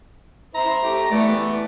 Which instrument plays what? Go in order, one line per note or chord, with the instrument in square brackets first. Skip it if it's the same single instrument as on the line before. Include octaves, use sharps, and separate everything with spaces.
[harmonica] E4 C5 [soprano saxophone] A#5
[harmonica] A3 G4
[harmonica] E3 B3 [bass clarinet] A3 [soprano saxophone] D5